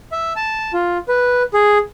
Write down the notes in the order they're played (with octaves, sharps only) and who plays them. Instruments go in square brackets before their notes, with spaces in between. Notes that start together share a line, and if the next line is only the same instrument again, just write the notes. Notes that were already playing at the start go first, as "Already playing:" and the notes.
[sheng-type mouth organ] E5
A5
F4
B4
G#4